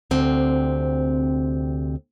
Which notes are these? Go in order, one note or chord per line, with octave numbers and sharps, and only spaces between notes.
D2 C3 C4